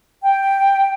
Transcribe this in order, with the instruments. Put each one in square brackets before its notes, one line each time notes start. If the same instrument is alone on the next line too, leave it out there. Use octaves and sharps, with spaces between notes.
[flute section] G5